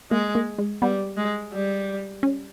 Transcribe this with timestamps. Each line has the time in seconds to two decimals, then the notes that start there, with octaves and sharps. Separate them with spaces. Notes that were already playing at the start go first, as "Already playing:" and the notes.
0.11 G#3 A#3
0.35 A#3
0.58 G#3
0.82 G3 B3
1.17 G#3
1.53 G3
2.23 C#4